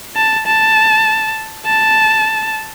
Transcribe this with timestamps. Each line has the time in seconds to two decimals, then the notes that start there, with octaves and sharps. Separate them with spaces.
0.16 A5
0.46 A5
1.66 A5